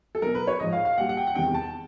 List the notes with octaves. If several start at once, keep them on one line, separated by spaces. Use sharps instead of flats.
A4
B2 F#3 A#4
B4
C#5
G#2 F3 D#5
F5
F5
A#2 G3 F#5
F#5
G5
F#5
E2 C3 D#3 G3 G5
A5